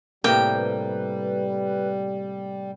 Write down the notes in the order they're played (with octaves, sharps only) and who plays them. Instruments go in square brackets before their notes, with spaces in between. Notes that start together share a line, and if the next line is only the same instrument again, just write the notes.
[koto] A2 C3 A#3 [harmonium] G3 [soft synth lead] B4 [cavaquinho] G5